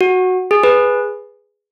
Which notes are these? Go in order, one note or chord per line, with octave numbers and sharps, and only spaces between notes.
F#4
G#4
G#4 B4